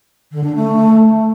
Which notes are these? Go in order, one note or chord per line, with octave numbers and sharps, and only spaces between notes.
D3
D4
A3